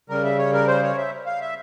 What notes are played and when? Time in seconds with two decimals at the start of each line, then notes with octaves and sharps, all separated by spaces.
0.09 C#3 G3 A#4
0.24 E5
0.38 C#5
0.53 A#4
0.67 C5
0.83 C#5
0.97 E5
1.26 F5
1.41 E5